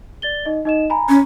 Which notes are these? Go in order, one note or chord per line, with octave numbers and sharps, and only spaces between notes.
D5 A6 G7
D#4 D#5
D#4 D#5 E7
G#5 A#5 B5
C#4